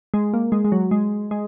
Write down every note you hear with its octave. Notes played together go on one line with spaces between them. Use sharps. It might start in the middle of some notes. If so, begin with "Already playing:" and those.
G#3
A#3
G#3
G#3
F#3
G#3
G#3